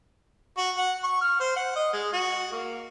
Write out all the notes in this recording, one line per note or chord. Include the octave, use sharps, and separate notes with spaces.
F#4
F#5
C#6
F6
C5
F#5
D#5
G#3
F#4
A#3